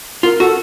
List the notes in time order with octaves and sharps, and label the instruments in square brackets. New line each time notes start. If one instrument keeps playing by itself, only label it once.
[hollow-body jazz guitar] F4 [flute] A#4
[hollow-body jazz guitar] F#4 [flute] A4